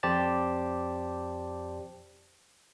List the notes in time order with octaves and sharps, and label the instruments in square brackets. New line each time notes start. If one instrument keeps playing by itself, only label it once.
[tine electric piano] F2 G4 C5 D5 A5 A6